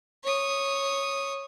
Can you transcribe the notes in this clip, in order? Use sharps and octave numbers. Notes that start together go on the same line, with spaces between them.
C#5 D#6